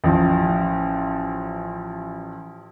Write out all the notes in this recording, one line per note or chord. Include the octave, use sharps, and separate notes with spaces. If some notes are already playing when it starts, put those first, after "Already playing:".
A1 F3